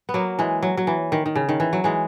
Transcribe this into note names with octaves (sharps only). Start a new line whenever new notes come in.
B3
F#3 A#3
E3 G#3
F#3
F#3
E3
D#3
D#3
C#3
D#3
E3
F#3
E3 G#3